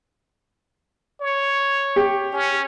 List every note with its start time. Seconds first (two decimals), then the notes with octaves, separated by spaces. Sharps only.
1.21 C#5
1.96 G4
2.33 C#4